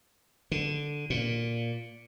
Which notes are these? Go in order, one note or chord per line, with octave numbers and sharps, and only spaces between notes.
D3
A#2